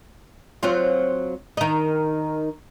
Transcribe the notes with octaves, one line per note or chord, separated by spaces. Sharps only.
F#3 C4 F4
D#3 D#4